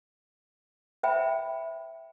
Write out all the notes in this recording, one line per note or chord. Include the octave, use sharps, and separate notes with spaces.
C5 E5 G5 B5